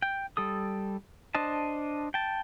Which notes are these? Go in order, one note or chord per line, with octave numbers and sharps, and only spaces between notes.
G5
G3 A4 D#6
D4 C5 D#5 A5
G5 A5